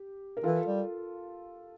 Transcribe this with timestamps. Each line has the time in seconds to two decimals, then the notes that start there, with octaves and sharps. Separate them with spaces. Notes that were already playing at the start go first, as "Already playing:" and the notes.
Already playing: G4
0.37 A#4
0.43 E3 F4 A4
0.66 G3